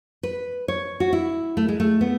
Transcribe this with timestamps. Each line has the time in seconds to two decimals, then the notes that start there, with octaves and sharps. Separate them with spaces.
0.23 B4
0.68 C#5
1.00 F#4
1.13 E4
1.57 A3
1.68 G#3
1.80 A3
2.01 B3